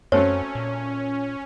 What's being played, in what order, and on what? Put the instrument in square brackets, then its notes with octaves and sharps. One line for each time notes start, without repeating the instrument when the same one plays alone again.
[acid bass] F#2 [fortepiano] F#3 A3 C4 [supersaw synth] C#4 [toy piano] C#5
[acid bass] A#2